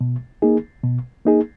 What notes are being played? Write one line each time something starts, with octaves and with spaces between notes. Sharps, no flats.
B2
A#3 D#4 G#4
B2
A#3 D#4 G#4